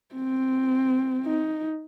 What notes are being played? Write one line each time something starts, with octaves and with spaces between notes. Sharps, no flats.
C4
D#4